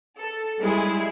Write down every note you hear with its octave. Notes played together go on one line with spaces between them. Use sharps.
A4
G3 G#3 E4 G#4